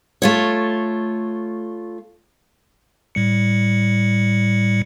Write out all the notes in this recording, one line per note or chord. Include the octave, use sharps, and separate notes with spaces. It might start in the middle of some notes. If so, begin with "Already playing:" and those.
A3 F4 C#5
A2 G3 C#7